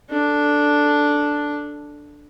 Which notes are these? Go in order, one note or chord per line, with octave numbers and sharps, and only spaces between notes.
D4 A4